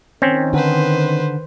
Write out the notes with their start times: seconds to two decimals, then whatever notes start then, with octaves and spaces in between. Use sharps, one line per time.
0.22 D#3 C4 C#4
0.53 D3 B4 C5